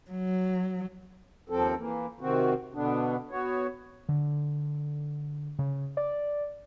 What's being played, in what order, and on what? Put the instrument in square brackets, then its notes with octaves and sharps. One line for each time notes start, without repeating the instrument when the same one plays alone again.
[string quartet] F#3
[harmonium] D#2 F3 C4 A4
E3 A#3
C3 D#3 C4 F#4
B2 D3 B3 D4
B3 F#4 C#5
[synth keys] D3
C#3
D5